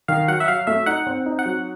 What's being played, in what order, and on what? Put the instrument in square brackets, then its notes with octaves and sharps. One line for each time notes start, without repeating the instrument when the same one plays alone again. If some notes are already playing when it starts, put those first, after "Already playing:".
[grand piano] D#3 [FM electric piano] F5
[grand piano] F#3 [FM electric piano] F#5
[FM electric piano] E5
[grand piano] F#3 [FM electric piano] F5
[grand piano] A3 [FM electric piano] E5
[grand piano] D#4 [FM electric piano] F#5
[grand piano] C4
D#4
[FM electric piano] F#5
[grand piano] F#3